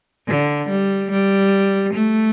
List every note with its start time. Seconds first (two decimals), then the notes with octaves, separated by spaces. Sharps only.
0.28 D3
0.69 G3
1.11 G3
1.94 A3